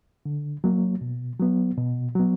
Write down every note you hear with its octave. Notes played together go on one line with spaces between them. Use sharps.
D3
F#3 A#3
B2
F#3 B3
B2
F#3 B3